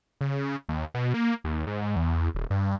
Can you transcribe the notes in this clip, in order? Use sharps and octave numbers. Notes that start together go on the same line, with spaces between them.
C#3
D#2
B2
A#3
D#2
G#2
G#2
E2
D#1
G2